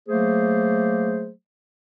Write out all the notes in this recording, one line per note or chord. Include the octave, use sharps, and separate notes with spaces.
F#3 A3 A#3 G#4 C5